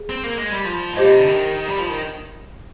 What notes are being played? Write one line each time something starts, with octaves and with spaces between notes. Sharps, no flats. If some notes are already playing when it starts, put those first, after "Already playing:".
Already playing: G#4
C4
A#3
G#3
G3
F3
G#2
A#2 G4 C5 D#5
C3
D3
D#3
G3
F3
D#3